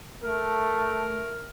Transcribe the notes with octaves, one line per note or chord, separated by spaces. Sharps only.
A3 A#4